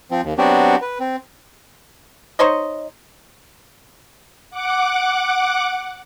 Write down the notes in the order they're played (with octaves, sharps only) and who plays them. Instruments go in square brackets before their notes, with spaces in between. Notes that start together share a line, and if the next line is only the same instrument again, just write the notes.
[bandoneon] F3 C4
D#2
F#3 B3 C4 D4 F#4 G4
B4
C4
[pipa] D#4 C5 C#5 D#5
[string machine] F#5 D6